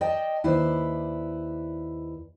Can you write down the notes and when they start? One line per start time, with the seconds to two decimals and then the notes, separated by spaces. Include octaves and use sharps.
0.01 D5 D#5 G5 A5
0.44 D#2 E4 B4 C5 D5